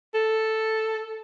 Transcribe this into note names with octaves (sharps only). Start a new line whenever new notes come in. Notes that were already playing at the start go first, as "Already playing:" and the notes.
A4